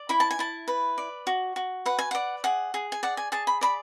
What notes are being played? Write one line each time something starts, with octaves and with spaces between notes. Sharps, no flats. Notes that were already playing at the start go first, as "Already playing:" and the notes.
Already playing: D5
E4 B5
A5
G#5
E4 A5
B4
D5
F#4
F#4
B4 F#5
G#5
D5 F#5
G#4 F#5
G#4
G#5
D5 F#5
G#5
G#4 A5
B5
D5 B5